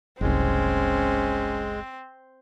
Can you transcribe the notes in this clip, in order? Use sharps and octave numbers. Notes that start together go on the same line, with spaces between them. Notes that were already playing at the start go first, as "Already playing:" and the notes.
F#1 C2 G#3 C4 C#4